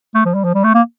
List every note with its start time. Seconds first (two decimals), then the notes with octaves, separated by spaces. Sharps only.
0.15 A3
0.25 F3
0.35 G3
0.44 F3
0.55 G3
0.64 A3
0.75 A#3